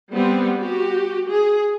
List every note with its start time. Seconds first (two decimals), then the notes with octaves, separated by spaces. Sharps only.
0.12 G3 B3 C4
0.60 F#4 G4
1.30 G#4